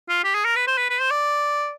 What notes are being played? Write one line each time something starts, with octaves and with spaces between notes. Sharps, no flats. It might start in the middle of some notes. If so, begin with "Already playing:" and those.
F4
G4
G#4
A#4
B4
C5
B4
B4
C5
D5